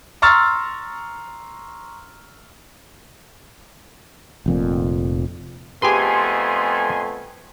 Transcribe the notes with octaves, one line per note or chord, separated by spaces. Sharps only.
A#5 C6 C#6 E6 F6 A6
F1 F2 A#2
F2 A3 B3 G4 G#4 B4 G#5 C6